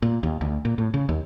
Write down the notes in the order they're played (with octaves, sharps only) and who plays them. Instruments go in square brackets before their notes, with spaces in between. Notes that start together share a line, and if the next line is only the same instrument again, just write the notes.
[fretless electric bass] A#2
D#2
D2
A#2
A2
C#3
D#2